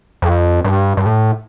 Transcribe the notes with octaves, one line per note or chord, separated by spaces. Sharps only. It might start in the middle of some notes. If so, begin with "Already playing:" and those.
F2
G2
G2
A2